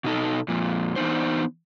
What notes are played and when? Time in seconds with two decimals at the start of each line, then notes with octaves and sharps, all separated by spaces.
0.04 B2 D#4 A4
0.48 F2 A#2
0.96 E3 B3 D4 D#4 C5